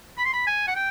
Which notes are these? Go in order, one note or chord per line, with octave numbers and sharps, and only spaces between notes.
B5
C6
B5
G#5
F#5
G5